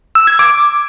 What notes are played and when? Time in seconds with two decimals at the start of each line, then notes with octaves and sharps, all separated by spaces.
0.15 E6
0.27 G#6
0.39 D6